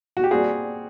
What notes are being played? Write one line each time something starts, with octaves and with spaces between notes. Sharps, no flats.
F#4
G4
A#2 G3 C4 F#4 G#4